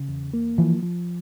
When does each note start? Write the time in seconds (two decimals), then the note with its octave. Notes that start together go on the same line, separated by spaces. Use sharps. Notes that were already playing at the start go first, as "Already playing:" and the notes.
Already playing: C#3
0.09 E2
0.34 A#3
0.58 E3 F3
0.83 F3